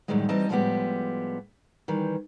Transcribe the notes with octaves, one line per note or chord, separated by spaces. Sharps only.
F#2 A2 D3 D#3 G3 G#3
E3 G3 C4 D#4 D#5 A5
A2 F3 G3 G#3 B3 G4
D#3 E3 G3